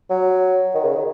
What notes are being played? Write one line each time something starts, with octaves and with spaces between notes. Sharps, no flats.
F#3
D#3
C#3
D#3